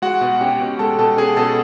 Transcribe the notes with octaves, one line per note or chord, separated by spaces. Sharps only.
G#3 F#4 F#5
B2
C#4 G4 G5
B2
G#3 A4 A5
B2 A4 A5
C#4 G#4 G#5
B2 A4 A5